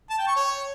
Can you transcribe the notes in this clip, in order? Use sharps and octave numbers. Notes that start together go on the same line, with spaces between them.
A5
G5
C#6
C#5